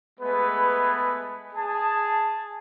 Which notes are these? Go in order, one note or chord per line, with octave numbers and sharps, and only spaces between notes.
G#3 A3 B3 G#4 B4
G#4 A5